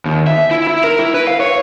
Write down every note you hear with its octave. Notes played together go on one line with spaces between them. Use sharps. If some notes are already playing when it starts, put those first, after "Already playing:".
D#2
E5
E4
E4
A#4
E4
B4
F5
C#5